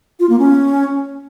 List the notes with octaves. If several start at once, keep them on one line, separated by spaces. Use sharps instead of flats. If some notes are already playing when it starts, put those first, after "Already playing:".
F4
A#3
C#4